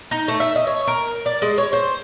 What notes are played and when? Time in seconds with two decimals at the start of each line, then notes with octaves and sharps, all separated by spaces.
0.11 D#4
0.28 A3
0.40 E5
0.56 D#5
0.67 C#5
0.87 A#4
1.26 D5
1.42 G#3
1.58 C#5
1.73 C5